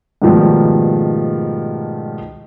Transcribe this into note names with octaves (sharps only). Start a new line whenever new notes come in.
G#2 B2 D#3 F3 G3 A3